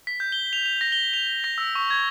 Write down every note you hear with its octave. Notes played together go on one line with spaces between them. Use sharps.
B6
G6
G7
F7
F7
A#6
G7
F7
A#6
E6
C#6
G#6